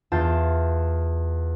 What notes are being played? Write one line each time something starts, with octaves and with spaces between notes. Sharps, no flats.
E2 F4 A5 G6